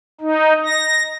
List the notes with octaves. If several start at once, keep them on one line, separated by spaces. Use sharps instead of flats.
D#4
A#6